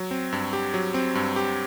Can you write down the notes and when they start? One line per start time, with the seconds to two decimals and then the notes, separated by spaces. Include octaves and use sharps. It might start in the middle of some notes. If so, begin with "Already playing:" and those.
Already playing: F#3
0.11 C4
0.32 G2
0.53 G4
0.74 F#3
0.94 C4
1.15 G2
1.36 G4